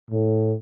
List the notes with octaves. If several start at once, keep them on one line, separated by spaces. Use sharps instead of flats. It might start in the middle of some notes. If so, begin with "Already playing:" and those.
A2